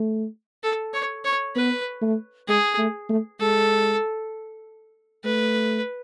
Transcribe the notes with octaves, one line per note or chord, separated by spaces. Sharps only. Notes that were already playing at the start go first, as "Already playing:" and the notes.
Already playing: A3
A4
C#5
C#5
B3 B4
A3
G#3 G#4
A3
A3
G#3 A4
A3 B4